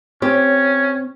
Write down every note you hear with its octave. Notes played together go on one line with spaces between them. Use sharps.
C4 C#4 G4 C#5